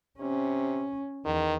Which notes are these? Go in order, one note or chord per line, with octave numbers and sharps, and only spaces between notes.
C3 C#4
E2 D#3